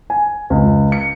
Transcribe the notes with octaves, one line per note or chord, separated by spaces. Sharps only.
G#5
C#2
C#7